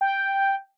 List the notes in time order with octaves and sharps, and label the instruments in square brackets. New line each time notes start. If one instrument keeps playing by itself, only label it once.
[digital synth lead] G5